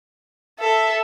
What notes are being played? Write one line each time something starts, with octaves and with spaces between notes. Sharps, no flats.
A4 E5